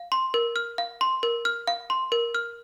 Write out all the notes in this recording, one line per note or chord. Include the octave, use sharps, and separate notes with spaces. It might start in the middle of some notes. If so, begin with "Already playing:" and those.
Already playing: F5
C6
A#4
F6
F5
C6
A#4
F6
F5
C6
A#4
F6